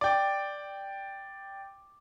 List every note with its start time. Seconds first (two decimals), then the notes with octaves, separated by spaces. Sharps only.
0.01 D5 G5